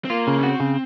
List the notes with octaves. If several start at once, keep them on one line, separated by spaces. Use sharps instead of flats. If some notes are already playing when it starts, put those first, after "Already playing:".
C4
A#3 F4
C#3
C#4
C4 F#4
C#3